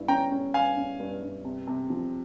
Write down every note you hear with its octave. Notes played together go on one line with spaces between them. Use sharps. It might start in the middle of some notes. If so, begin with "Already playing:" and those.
Already playing: G2 E4
C#4 G5 A#5
C#4
G2 F5 G#5
C#4
G2
G2
C3
C3
F3